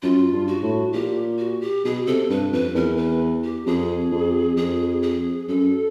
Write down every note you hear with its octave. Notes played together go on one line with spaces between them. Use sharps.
F#2 F4
G2
F#4
A2
A#2 G4
F#4
G4
B2 G#4
C3 A4
G2 B4
F2 B4
E2 A#4
B4
G4
F2 G#4
F2
F2 G#4
G#4
F#2 A4